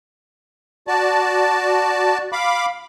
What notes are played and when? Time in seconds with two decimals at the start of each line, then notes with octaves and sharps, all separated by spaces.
0.88 F#4 D5 A5
2.32 F5 B5 D6